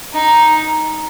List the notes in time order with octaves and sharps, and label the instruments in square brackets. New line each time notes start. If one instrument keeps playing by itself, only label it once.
[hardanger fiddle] D#4